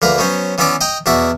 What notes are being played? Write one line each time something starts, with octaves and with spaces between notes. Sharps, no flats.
D2 A#3 B4 A#5
F#3 B3 C#4 C5
E3 B3 C#4 E4 D5 D6
D#5 G5 A#5
E2 B2 F#4 D5 E5